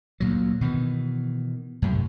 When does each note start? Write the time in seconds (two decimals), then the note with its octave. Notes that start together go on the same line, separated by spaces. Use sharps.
0.20 D2 A#2 F#3
0.61 B2 D#3 E3
1.82 F#2 A2 C3